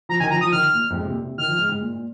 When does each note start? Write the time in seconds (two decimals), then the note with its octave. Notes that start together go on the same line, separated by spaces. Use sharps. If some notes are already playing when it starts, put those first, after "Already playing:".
0.09 F3 A#5
0.20 D#3 G#5
0.31 F3 A#5
0.41 F3 D#6
0.52 D#3 F6
0.73 A#2
0.90 F2
0.94 G#2
1.05 C3
1.10 A#2
1.24 C3
1.38 D#3 F6
1.48 F3
1.59 G#2
1.69 G#2
1.80 A#2
1.93 A#2